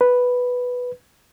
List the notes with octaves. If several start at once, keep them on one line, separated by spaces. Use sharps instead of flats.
B4